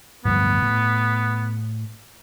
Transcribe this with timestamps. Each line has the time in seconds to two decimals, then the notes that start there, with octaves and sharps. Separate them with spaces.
0.25 D1 G2 F3 B3
0.62 A2